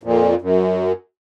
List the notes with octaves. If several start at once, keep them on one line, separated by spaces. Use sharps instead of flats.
F2 A#2
F#2